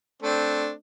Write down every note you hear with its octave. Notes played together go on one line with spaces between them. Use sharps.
A3 C4 D4